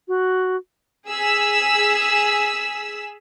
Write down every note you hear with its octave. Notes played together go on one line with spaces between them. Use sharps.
F#4
G#4 E6 B6